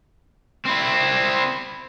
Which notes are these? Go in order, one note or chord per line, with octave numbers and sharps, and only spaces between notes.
C4 E4